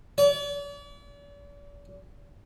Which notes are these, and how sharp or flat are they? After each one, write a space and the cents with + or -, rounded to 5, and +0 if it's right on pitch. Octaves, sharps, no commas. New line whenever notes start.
D5 -45